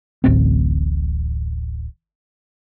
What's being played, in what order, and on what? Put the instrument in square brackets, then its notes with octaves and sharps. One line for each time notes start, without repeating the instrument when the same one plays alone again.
[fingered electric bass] D1 A1 C4